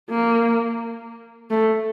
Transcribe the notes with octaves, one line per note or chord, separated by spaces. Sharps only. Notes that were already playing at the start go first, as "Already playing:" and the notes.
A#3
A3